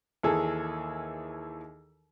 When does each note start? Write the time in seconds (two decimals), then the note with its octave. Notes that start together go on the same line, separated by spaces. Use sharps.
0.23 D#2 E3 G#4 A4